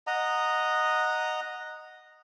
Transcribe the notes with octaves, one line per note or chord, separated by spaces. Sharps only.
D#5 F#5 A#5 D#6